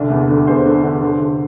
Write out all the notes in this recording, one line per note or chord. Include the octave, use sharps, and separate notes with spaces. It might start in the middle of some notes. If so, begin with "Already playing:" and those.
Already playing: C2 D3 D5
E2
D3
E2 C5
D3
D3
D3
D3